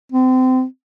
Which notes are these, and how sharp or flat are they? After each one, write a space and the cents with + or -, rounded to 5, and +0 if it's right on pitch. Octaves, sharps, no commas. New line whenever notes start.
C4 -30